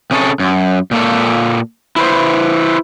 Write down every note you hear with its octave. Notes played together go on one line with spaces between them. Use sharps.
C3 C#4 G#4 A4
F#2
A#2 A#3 A4
E4 B4 C5